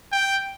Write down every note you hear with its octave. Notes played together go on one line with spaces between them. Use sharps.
G5